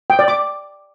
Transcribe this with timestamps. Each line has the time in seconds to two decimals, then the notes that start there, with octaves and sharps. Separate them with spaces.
0.10 G5
0.19 D5
0.28 D6